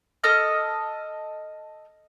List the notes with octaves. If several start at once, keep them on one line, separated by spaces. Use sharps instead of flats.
A4 D#5 E6 F6